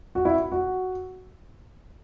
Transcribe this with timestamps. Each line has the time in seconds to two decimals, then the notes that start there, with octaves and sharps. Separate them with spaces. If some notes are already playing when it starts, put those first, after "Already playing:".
0.15 F#4
0.25 E4
0.52 F#4